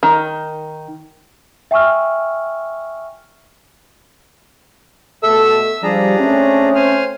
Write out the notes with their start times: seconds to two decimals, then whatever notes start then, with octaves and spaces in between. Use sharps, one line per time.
0.03 D#3
1.71 E5 G5 G#5 C#6 E6 F6
5.23 B2 A3 A4 E5 E6
5.83 F3 G3 D4 G#4 A#5
6.18 A3 C4 C#4
6.75 C5 G#5 F6